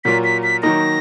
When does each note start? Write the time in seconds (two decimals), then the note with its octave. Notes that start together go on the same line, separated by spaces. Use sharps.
0.04 A#2 F#3 A#3 F4 B6
0.24 B6
0.43 B6
0.62 D#3 F#3 A#3 D#4 A#4 A#6